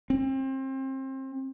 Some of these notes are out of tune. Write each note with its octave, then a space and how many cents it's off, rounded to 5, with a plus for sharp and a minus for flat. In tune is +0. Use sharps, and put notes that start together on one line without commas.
C4 +30